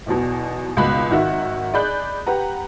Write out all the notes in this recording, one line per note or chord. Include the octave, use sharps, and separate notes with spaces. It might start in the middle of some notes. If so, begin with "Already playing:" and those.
B1 E2 B2
G#1 C#2 B2 B5 F#6
G#1 D#3 F#4 E5
G#4 D5 D#5 B5 F#6 G6
G4 B4 F#5 A#5